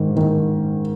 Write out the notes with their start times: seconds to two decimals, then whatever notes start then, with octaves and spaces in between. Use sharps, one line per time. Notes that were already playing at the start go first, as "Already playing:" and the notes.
Already playing: G#2 D#3
0.16 D#3